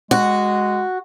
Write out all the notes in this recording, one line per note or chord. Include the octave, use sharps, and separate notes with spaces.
G#3 F#4